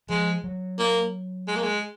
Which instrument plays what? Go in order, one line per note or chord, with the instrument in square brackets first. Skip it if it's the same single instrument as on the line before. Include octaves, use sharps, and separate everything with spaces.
[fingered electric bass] F3 [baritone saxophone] G#3
[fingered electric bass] F#3
[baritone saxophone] A#3
G#3
A#3
G#3